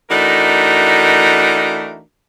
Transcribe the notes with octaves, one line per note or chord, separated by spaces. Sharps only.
E3 A3 D4 D#4 F#4 A#4